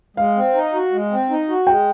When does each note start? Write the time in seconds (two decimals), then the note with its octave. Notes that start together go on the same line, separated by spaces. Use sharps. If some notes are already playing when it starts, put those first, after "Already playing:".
0.16 G#3 F5
0.36 C4
0.55 D#4
0.73 F#4
0.92 G#3
1.11 C4
1.30 D#4
1.49 F#4
1.67 G#3 G5